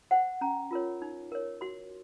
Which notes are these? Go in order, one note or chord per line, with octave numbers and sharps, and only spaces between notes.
C5 F#5
C#4 A#5
F4 A#4 C#5
D#4
A#4 C#5
F#4 C6